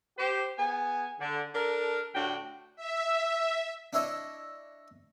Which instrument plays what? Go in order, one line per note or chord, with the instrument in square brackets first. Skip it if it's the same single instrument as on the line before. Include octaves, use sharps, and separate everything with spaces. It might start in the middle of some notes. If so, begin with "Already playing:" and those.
[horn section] G4 C5
B3 G#4 G#5
D3
D4 A4 A#4
A2 D3 D4 F#4 G5
[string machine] E5
[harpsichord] D4 E4 A4 C#5 D#5